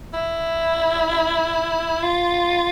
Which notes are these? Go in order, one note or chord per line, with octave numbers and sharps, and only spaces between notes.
E4
F4